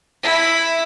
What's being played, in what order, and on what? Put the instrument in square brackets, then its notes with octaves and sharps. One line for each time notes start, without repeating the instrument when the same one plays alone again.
[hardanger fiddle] E4